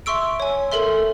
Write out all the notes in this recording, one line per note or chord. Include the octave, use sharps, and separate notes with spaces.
E5 C6 C#6 E6 D7
C#5 G#5
A4 A#4 E5 C6